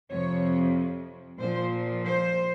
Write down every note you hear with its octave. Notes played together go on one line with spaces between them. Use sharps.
F2 C3 F3 C#5
A#2 F3 C5
C5